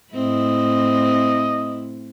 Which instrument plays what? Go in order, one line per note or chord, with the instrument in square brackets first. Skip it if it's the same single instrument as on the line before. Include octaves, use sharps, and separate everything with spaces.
[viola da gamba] A2 C4 E4 [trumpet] D#5